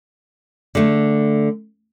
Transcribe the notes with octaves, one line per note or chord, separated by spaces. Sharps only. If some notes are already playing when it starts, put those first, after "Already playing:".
D3 A3